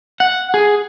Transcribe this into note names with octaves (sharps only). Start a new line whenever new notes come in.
F#5
G#4